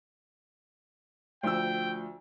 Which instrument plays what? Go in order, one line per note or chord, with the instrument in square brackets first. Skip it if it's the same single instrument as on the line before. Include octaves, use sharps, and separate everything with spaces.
[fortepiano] D2 F3 E6 [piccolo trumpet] G5